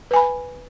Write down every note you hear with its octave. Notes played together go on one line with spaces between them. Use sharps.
B4 G#5 B5